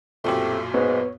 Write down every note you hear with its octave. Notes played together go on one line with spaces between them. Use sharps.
B1 F#2 A#2 A3 C4 G4
G#2 B3 C#5